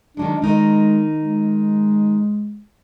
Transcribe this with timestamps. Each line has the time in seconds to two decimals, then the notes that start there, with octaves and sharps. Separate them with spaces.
0.17 D#3 F#3 G#3 D4
0.42 D#3 G#3 D#4 A#4
1.19 G#3